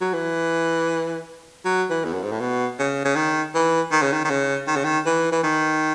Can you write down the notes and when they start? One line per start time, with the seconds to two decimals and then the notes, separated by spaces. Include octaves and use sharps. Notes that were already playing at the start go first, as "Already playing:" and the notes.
0.01 F#3
0.13 E3
1.65 F#3
1.90 E3
2.04 E2
2.13 F#2
2.23 G#2
2.32 A2
2.40 B2
2.79 C#3
3.05 C#3
3.16 D#3
3.55 E3
3.92 D#3
4.02 C#3
4.13 D#3
4.25 D#3
4.30 C#3
4.67 D#3
4.76 C#3
4.84 D#3
5.06 E3
5.32 E3
5.43 D#3